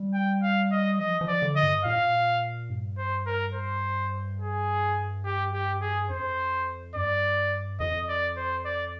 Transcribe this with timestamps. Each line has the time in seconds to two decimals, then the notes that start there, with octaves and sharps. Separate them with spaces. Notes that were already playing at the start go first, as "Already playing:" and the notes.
Already playing: G3
0.14 G5
0.43 F5
0.72 D#5
0.99 F3 D#5
1.21 F3
1.28 D5
1.42 D3
1.56 D#5
1.63 G2
1.85 A#2 F5
2.70 G2
2.98 C5
3.27 A#4
3.55 C5
4.40 G#4
5.25 G4
5.53 G4
5.81 G#4
6.10 F2 C5
6.95 G2 D5
7.80 F2 D#5
8.08 D5
8.37 C5
8.65 D5